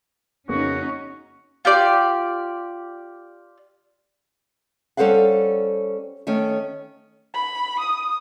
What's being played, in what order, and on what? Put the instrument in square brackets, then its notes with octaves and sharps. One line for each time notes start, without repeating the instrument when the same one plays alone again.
[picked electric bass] F2 A#3 B3 [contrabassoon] C#3 [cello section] C#4 D#4 [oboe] F#4
[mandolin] F4 G4 D5
[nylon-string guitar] G3 C#4 A4 C5 F5 F#5
D#3 A3 C#4
[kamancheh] B5
D#6